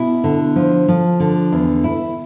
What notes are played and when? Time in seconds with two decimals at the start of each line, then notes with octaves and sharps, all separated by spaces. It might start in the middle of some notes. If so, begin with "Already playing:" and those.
Already playing: B2 E4
0.24 D3
0.56 F3
0.88 F3
1.20 D3
1.52 E2
1.84 E4